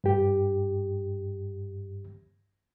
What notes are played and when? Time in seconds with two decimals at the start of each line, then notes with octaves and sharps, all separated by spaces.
0.04 G2 G4